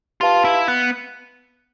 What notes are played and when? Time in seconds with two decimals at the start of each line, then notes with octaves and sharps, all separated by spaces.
0.21 F4 G4 B4 F5 A5
0.44 E4
0.68 B3